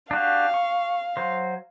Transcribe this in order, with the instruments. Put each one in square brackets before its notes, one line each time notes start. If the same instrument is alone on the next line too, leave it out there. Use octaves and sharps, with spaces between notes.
[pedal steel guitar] D4 F#4 G4 [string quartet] F5
[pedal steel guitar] C#6
F#3 C5